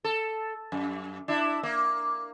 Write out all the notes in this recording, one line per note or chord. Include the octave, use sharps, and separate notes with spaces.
A4
F#2
D4 E4
A#3